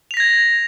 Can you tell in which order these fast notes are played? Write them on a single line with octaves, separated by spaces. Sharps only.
F7 B6 A#6 G#6